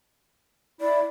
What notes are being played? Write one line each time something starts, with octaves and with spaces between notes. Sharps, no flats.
E4 D5